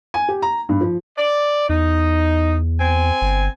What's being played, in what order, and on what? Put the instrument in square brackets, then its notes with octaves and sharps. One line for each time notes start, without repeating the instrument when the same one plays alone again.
[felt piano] G#5
G4
A#5
G2
F3
[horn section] D5
[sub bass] E2 [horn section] D#4
[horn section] C4 G#5
[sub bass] G1